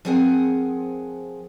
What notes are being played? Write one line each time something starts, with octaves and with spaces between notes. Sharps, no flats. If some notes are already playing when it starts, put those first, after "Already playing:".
F3 C4 G#4 A#4 F#5 G#5